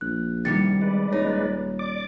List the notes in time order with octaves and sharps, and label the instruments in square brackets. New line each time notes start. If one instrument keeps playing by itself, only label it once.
[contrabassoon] A#1 [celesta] F#6
[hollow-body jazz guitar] C2 D#3 G3 [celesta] A6 C#7
[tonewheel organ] G#3 B4 D5
[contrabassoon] D#1 [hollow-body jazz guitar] D#4 [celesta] C#5
[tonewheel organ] D5 D6